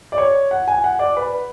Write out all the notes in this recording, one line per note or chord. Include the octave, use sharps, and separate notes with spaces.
D5
C#5
F#5
G#5
F#5
D5
B4